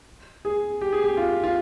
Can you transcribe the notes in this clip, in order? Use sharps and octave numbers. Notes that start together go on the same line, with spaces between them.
G#4
G4
G#4
G4
F4
F4